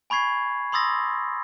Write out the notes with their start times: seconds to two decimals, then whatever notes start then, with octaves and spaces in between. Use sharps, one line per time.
0.10 G#5 B5 C#6 G#6 C7
0.72 B5 C6 D#6 E6 A6 A#6